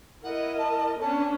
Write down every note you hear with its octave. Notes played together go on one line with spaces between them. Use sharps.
E4 A#4 D#5 F#5
A5
B3 C#4 D4 A5